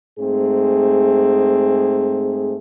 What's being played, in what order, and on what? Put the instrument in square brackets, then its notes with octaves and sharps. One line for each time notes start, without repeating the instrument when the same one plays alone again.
[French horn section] G#2 A3 C4 G#4